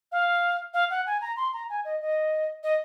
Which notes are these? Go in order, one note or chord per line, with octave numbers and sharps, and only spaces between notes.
F5
F5
F#5
G#5
A#5
C6
A#5
G#5
D#5
D#5
D#5